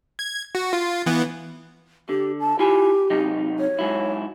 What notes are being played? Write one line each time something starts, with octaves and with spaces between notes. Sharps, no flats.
G#6
F#4
F4
E3 B3
D3 G4
A5
E4 F4 G4 G#5
C3 F#3 D#4
C#5
G#2 F#3 E4